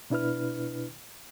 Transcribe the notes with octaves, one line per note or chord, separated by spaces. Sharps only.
B2 D4 E4 B4 F6